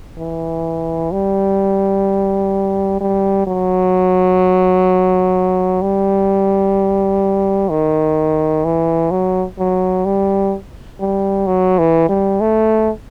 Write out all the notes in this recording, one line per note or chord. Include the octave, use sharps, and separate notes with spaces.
E3
G3
G3
F#3
G3
D#3
E3
F#3
F#3
G3
G3
F#3
E3
G3
A3